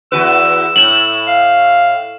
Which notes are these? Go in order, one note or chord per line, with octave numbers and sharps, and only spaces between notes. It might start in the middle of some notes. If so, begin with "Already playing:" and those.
E2 F#4 B4 E6
A2 E7 F#7
F5